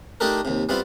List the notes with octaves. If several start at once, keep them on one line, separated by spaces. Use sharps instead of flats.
A3 D4 D#4 G4 A4 A#4
D#2 C3
G3 B3 C4 E4 F4